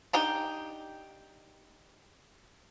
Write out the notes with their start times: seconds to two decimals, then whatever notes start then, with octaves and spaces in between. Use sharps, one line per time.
0.13 D4 D#4 G4 G5